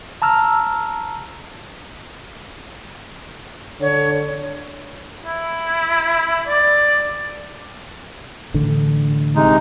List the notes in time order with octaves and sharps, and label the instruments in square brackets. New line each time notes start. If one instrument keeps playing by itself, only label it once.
[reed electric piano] A5 A#5 E6 F6
[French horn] D3 [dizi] C#5
[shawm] E4
E4
D5
[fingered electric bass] A1 D3
[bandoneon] C3 G#3 D#4